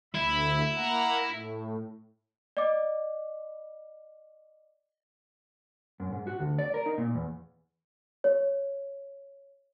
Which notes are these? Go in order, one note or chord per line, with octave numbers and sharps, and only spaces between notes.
D2 E4 E5 B5
A#3 F#5 A#5
A2
D5 D#5 D6
F#2
G#2
F#4
D2
D5
A#4
D#4
A#2
E2
C#5